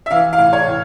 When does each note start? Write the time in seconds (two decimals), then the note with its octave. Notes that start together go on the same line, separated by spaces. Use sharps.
0.06 E5
0.11 E3 F5
0.33 F5
0.39 A2
0.53 C#5
0.67 A2